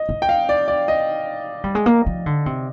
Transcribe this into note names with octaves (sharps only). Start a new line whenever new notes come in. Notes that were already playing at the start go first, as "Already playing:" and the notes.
Already playing: D#5
C4
G5
F5
D5
D5
D#5
G3
G#3
A#3
F3
D3
C3